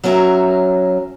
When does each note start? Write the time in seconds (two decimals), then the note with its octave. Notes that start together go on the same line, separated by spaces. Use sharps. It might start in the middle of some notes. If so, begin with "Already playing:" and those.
0.04 F#3 C#4 A#4 E5